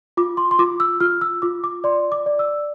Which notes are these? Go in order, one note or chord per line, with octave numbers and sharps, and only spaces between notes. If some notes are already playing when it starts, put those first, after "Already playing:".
F4 D6
C6
C6
F4 D6
E6
F4 F6
E6
F4 D6
D6
D5 C6
D6
D5
E6